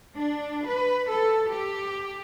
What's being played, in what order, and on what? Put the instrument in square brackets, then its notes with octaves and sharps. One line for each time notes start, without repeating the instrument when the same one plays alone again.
[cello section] D4
B4
A4
G4